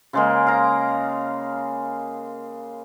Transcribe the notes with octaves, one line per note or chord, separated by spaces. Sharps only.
C#3 G#3 A#3
F5 A#5